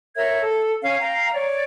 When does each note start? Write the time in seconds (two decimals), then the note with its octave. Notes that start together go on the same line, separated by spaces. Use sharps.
0.17 A#4 C#5 E5 G#6
0.42 A4
0.81 C#4 F5
1.01 F5 G5 A#5
1.33 C#5 D5